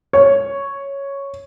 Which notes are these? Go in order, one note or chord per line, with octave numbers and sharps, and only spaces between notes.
C#5